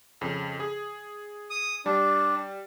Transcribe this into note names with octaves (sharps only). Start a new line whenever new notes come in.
F2 C#3
G#4
D#6
G3 D4